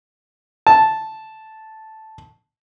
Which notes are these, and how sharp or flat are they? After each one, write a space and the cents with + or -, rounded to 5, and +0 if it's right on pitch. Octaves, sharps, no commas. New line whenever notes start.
A5 -5